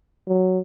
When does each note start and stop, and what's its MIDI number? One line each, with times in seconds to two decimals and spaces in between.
0.28 0.59 54